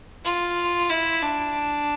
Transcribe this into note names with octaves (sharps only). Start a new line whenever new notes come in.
F4
E4
D4